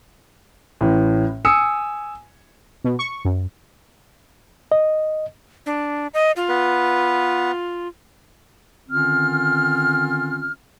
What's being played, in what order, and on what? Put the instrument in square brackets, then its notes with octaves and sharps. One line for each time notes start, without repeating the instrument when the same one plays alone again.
[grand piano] A1 A2
G#5 D#6 E6 C#7
[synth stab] B2
C#6
F#2
[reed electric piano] D#5
[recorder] D4
D#5
F4
[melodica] B3 B4
[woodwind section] D3 D#3 C4 C#4 F4 F6